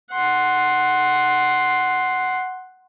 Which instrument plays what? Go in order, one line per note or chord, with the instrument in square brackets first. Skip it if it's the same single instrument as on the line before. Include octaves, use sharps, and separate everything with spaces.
[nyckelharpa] F#5 C6